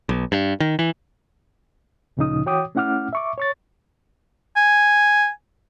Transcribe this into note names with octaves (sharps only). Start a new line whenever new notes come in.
B1
G2
D#3
E3
D2 A#2 C#3 F3 D#4 D#6
E3 F#4 C#5 G5 D6 D#6
A3 C#4 E4 F#5 D6 F6
E5 C#6 D6
C#5 C#6 A6
G#5